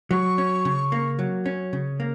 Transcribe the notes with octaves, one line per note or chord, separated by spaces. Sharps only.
F#3 C#6
C#4
C#3
A#3
F#3
C#4
C#3
A#3